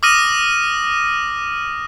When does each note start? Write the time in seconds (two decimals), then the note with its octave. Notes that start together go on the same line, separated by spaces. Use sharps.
0.03 D6 D#6 F6 A#6 D#7